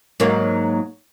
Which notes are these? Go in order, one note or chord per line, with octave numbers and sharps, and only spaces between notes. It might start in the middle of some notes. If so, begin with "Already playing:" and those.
G#2 F#3 A#3